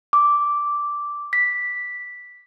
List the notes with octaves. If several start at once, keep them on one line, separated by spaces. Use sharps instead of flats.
D6
B6